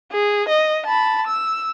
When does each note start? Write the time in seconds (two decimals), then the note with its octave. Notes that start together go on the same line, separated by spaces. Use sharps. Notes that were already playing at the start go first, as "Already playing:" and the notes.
0.11 G#4
0.48 D#5
0.86 A5 B5
1.27 E6